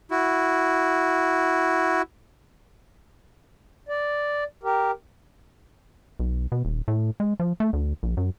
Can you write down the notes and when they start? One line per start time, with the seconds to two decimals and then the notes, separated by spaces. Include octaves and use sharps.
0.11 E4 F#4
3.89 D5
4.63 G4 A#4
6.20 B1
6.52 B2
6.65 D#1
6.88 A2
7.20 G#3
7.40 F3
7.60 A3
7.73 D2
8.03 A#1
8.17 F#2